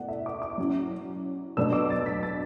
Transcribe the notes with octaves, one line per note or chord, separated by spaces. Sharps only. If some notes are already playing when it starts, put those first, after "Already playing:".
Already playing: B2 A3 E4 D5 F#5
E5
D6
D6
F#3 C#4 E4
B2 F#3 A3 D4 E6
D6
A6
B6
A6